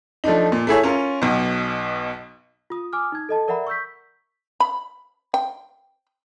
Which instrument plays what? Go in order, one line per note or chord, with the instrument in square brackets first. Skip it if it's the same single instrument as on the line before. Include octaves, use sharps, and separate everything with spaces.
[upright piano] F3 A3 D4 D#4
A#2
A3 E4 G#4 C#5
C#4 F4 A#4
B1 B2
[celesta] F4 D#6
G#5 D6 D#6 F6
D#4 G#6
A4 D#5 A5
A#4 D5 E5 F#5 A#5 B5
C#6 E6 G6 B6
[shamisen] B5
G5